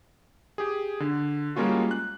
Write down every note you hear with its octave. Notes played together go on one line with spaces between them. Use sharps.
G4 G#4
D3
G3 G#3 A#3 C#4 F4 F#4
F#6